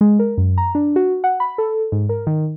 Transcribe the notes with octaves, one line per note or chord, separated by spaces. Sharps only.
G#3
A#4
F#2
A#5
D4
F#4
F#5
B5
A4
G#2
A#4
D#3